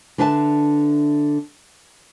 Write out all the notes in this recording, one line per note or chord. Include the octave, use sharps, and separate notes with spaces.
D3 D4 B4 E5 G#5 A5